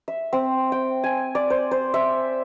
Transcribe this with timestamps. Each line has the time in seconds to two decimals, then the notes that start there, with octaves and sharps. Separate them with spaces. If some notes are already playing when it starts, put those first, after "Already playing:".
0.08 E5
0.33 C4
0.72 G5
1.04 G#5
1.35 D5
1.50 C5
1.71 C5
1.94 E5